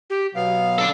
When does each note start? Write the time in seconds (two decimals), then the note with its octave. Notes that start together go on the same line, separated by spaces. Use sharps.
0.10 G4
0.35 B2 F#3 B3 F5
0.78 D4 A4